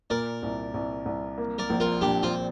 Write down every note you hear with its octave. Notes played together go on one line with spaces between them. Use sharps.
A#2 A#4 D5
C2
C2
C2
A#3
A#4 D5
A#1
F4 A#4
A#2 D4 G4
C4 F4